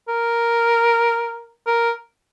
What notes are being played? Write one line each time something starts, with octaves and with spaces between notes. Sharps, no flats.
A#4
A#4